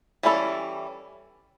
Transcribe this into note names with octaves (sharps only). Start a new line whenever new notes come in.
E3 G3 C#4 E4 A4